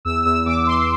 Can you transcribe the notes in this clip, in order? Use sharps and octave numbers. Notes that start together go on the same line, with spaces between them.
E2 E6
E2 E6
E2 D6
E2 C6